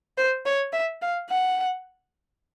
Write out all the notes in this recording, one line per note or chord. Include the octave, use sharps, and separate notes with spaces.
C5
C#5
E5
F5
F#5